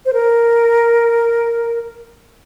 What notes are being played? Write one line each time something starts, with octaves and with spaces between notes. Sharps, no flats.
C5
A#4